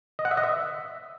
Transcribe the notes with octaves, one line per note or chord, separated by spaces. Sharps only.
D#5
F#5
E5
D#5
E5